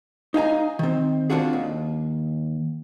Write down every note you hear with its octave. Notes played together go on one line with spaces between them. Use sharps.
D#4 F5 G#5 A#5
D#3 C4
C4 D4 F4 F#4 G#4
D#2